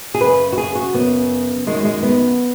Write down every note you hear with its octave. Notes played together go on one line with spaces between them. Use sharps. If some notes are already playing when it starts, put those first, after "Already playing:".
G#4
F#2 C#3 B4
F#4
G#4
F#4
F#2 C#3 B3
F#2 D#3 G#3
G#3
B3